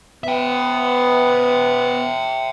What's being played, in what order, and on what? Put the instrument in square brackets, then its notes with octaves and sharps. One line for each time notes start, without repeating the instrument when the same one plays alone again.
[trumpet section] B3 [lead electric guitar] E5 G5